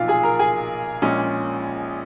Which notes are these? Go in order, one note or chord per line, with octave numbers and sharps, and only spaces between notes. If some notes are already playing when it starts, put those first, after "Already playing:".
Already playing: B1 A#2 F3 F4 F5
G#4 G#5
A#4 A#5
G#4 G#5
A#1 A#2 G#3 C#4